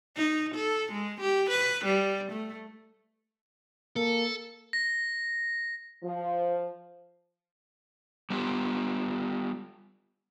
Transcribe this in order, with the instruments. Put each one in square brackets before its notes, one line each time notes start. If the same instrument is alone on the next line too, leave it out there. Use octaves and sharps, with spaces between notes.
[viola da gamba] D#4
A4
G#3
G4
B4
G3
A3
[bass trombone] A#3 [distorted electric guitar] A4
[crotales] A#6
[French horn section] F3
[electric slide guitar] G3 B3 F4 G4